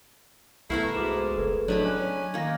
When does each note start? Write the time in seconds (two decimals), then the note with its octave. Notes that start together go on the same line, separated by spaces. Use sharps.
0.70 C2 A3 B3 E4 A#4 C#6 F6 C7
0.95 G#2 F#4 D6 E7
1.37 F#1 G#4 A4 B4
1.68 A2 F#3 D4 D#4 B5
1.85 C#4 F#6
2.34 D#3 A#3 G#6 A#6